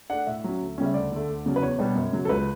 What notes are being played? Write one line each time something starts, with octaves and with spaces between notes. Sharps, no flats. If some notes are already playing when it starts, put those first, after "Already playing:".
A3 D4 F#5
A2 E5
F#3 C#4
D2
C#3 G3 C#4
E5
D2 D5
D3 A3
D2
C#3 F#3 C#4
B4
E2 C#5
B2 G3 D4
F#2
C#3 F#3
A4
C#2 B4